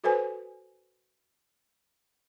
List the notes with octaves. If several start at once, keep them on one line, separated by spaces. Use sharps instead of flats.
F#4 A4 B4 C5 G#5